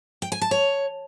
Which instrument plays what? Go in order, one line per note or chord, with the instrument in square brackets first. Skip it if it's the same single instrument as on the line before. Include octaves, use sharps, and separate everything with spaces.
[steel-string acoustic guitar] G5
G#5
A5
C#5